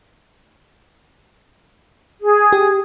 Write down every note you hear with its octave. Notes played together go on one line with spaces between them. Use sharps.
G#4
G4